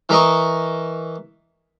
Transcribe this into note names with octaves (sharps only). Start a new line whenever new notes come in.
E3 A#4 D#5 C#6